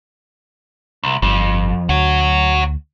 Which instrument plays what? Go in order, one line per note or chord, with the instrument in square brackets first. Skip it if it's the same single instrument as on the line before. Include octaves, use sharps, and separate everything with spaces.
[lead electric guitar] C2
[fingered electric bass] G1 [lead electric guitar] F2
[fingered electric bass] D2 [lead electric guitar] C#5 F#5